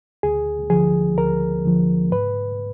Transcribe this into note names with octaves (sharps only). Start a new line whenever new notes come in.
D2 G#4
D3 F3 G#4
D2 A#4
D3 F3
G#2 B4